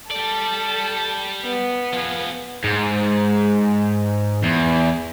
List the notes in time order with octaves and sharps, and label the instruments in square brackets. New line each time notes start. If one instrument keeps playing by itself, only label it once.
[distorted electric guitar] G3 D5 [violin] A4
[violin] B3
[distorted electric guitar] F3 G#4
[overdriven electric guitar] G#2
E2